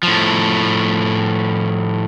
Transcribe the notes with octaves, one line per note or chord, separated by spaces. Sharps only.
A2 F3